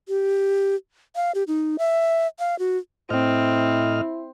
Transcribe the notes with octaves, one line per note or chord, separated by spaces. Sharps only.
G4
F5
G4
D#4
E5
F5
F#4
A2 C4 E4 D#5 F6